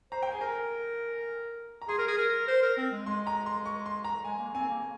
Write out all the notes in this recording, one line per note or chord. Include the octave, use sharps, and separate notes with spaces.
C5 A#5
G5
G#4 G#5
A#4 A#5
A#5
G#4 C6
A#4
G#4
A#4
C5
A#4
C4
G#3
G#3 C6
A#5
C6
C#6
C6
A#5
G#3 G#5
A#3
C4 G#5
A#3